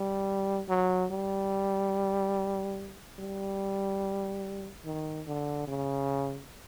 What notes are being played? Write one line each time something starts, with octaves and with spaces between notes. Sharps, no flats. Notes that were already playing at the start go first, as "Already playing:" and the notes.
Already playing: G3
F#3
G3
G3
D#3
D3
C#3